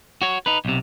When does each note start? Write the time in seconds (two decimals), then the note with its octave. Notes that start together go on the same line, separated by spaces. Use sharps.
0.22 F#4 C#5
0.46 D#4 B4
0.65 B1 C3